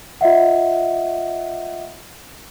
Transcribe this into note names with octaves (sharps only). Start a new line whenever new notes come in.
F4 D#5 E5 F#5